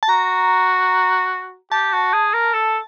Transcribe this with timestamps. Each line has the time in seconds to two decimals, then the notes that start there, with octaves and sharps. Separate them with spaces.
0.03 A5
0.09 F#4 A#5
1.72 G4 A5
1.93 F#4
2.13 G#4
2.34 A#4
2.53 A4